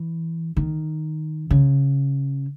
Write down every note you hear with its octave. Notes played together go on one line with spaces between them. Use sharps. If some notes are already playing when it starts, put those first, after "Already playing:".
Already playing: E3
D#3
C#3